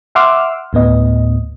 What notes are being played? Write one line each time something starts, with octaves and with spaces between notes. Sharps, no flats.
E5 F#5 C6 D6 E6 F6
D2 A2 B3 D#5